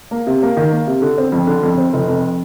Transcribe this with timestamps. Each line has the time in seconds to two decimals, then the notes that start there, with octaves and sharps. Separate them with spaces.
0.11 A#3
0.27 C3
0.42 A#3
0.57 D#3
0.72 A#3
0.87 C3
1.02 D3
1.18 C4
1.32 F2
1.47 D3
1.63 F2
1.78 C4
1.93 F1
2.08 F2